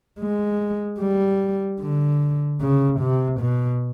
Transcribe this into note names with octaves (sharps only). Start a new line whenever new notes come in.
G#3
G3
D3
C#3
C3
B2